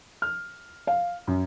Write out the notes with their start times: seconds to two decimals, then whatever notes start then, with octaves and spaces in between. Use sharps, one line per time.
0.22 F6
0.87 F5
1.27 F#2